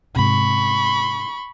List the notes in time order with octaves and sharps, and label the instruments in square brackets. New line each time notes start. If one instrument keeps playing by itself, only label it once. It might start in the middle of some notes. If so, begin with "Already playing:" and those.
[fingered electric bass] G#2 C3 [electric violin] B5 C#6